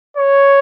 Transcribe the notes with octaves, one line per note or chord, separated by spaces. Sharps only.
C#5